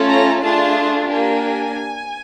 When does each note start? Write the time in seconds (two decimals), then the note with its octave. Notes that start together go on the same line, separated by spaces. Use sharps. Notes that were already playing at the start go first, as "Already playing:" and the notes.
Already playing: A3 C#4 F4 A4
0.09 A#5
0.42 A3 D4 F4 G#4 A5
1.07 A#3 D4 G4 G#5